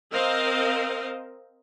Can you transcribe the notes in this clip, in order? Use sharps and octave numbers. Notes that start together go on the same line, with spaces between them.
C4 A#4 C5 D#5 F5